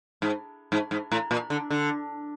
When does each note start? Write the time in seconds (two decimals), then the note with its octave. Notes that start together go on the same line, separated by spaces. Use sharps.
0.22 G#2
0.72 G#2
0.91 G#2
1.12 A2
1.31 A#2
1.50 D3
1.70 D3